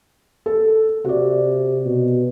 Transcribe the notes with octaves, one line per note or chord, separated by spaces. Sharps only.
A4
C3 F#4 D5
B2